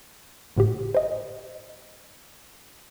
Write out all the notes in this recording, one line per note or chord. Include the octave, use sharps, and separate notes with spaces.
G1 A2 D3 G4
C5 D#5